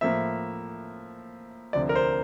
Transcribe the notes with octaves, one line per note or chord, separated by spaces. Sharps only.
A2 F3 A#3 E5
D2 C3 F3 D5
A#4
C5